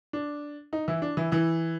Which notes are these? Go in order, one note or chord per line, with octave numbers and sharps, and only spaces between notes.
D4
D#4
E3 E4
D4
E3 E4
E3 E4